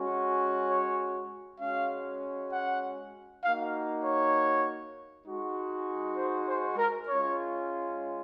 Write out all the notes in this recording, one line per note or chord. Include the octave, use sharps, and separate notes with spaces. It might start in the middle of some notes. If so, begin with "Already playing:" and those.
Already playing: G#3 C#4 F#4
C#5
G#3 C#4 F#4 F5
F#5
A#3 D#4 F#4 F5
C#5
G#3 D#4 F#4
C5
C5
A#4
G#3 C#4 F4 C#5